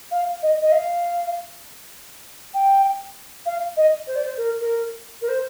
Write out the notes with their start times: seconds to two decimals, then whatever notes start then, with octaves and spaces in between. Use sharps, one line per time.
0.11 F5
0.42 D#5
0.61 D#5
0.71 F5
2.53 G5
3.45 F5
3.76 D#5
4.06 C5
4.15 D5
4.24 C5
4.37 A#4
4.60 A#4
5.21 A#4
5.28 C5